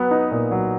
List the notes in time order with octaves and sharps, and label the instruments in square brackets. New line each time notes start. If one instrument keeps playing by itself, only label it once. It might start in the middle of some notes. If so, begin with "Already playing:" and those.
Already playing: [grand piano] F#3 B3 [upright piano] B4
[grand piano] D#4
A#2
F#3